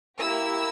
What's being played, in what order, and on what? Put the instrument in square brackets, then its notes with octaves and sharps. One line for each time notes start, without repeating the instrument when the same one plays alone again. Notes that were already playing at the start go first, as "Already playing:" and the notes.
[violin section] A#3 E4 G4 E6